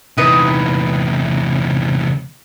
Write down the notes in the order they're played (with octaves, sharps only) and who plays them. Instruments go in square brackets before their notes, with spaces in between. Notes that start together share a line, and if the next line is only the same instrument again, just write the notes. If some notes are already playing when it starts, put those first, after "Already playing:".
[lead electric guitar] E2 C3 [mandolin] D#4 E4 B4